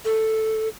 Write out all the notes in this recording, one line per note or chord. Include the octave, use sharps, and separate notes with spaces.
A4